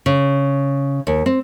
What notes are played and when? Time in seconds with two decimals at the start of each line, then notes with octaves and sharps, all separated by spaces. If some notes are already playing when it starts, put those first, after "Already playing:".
0.06 C#3
1.07 D#2
1.26 C4